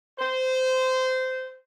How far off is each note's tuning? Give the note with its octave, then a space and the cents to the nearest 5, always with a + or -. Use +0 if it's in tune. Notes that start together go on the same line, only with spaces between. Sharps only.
C5 -20